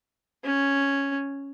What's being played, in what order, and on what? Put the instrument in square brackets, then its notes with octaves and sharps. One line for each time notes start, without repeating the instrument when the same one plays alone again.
[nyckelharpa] C#4